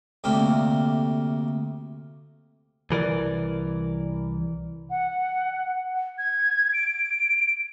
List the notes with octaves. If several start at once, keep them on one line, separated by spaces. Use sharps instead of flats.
D2 C3 A3 A#3 G4 F5
C2 E3 A#4 D5
F#5
G#6
D7